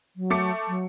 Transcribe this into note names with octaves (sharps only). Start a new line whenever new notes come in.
F#3
A3 D6 C#7
F#3